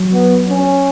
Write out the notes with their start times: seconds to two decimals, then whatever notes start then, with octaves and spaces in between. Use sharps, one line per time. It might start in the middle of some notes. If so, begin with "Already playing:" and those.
Already playing: F#3
0.13 B3
0.49 C#4